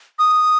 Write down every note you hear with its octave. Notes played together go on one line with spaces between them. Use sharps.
D#6